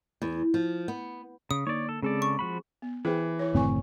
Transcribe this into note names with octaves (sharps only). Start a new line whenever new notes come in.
E2
F3
B3
C#3 D#6
D3 A#3 D#4 C#5 D5
A4
C#3 G#3 C4 G#4 A4 D5
C#6
F3 F#4 B5
B3
E3 G#4 C5 G5
E4 B4 C#5
F#1 A2 D#3 C4 G#5 C#6